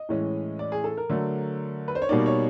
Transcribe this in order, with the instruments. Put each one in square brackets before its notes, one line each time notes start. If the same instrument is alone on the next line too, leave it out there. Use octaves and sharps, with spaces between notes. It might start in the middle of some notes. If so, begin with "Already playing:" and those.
Already playing: [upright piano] D#5
A2 E3 G#3 C#4
D5
G#4
A4
A#4
D3 F#3 A3
B4
C5
C#5
B2 G3 A#3 D#4 D5
C#5